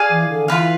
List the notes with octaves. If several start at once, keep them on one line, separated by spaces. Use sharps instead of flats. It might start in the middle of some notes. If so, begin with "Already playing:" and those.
Already playing: G#4 D5 F5 G#5
E3
D3
E3 F4 B4 F5